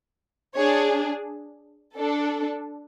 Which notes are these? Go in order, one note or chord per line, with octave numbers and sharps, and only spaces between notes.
D4 G#4 C#5
D4 A4